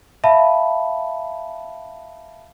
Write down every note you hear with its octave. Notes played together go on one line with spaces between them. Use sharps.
E5 F5 A5 B5